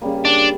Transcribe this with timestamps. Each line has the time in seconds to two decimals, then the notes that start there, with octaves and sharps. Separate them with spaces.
0.02 C#3 G3 A#3
0.25 D4